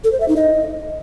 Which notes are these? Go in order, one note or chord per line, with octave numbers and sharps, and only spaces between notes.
A4
C5
E5
D#4
D#5